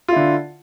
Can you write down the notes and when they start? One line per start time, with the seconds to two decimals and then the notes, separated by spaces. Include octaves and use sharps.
0.08 F4
0.12 E4
0.16 D3